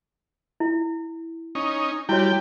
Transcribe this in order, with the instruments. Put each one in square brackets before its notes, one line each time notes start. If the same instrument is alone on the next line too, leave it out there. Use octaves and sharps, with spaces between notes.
[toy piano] E4
[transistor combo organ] C#4 D#4
[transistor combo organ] G3 G5 [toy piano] E4 F#4 C#5